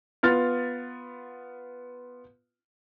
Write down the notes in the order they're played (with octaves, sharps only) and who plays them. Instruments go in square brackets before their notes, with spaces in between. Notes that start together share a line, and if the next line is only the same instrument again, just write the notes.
[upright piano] B3 F4 F6 A6